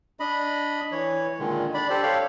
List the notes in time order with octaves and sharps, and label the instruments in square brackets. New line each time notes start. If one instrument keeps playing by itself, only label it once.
[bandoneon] D4 D#5 B5
E3 C#5
A#2 D3 D#3 G#3
D4 D5 B5
G4 A4 C5 D5
A4 C#5 F5 G5